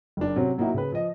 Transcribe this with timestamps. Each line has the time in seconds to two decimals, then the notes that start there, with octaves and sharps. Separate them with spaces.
0.17 F#1 D4
0.36 C3 F#3 C4 C#4
0.58 F#3 A#3 D#4 E4 F#4
0.74 C#3 B4
0.92 F3 D#5